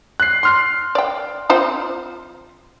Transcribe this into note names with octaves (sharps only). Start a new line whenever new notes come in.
F#6 C7
C6 F6 C7
D5 G5
C4 F4 C5